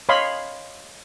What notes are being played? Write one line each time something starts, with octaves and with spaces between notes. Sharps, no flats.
C#5 D#5 F5 G#5 B5 C6